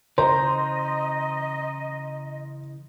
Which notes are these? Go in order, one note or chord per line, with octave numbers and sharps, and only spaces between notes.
C#3 E3 C5 D#5 A#5